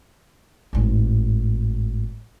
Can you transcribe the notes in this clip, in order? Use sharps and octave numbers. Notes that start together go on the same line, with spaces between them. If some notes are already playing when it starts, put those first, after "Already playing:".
G#1 A2